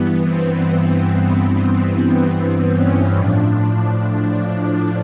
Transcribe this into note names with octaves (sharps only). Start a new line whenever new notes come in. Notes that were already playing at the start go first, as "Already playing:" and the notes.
Already playing: G2 E3 B3
C4
C4
C#4
A2 F3 D4